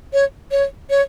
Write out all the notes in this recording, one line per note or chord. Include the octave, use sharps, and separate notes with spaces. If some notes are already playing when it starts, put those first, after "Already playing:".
C#5
C#5
C#5